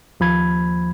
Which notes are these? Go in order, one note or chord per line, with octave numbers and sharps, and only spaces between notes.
D#2 F3 B5 G#6